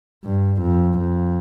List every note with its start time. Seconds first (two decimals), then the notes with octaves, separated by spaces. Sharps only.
0.24 G2
0.62 F2
0.99 F2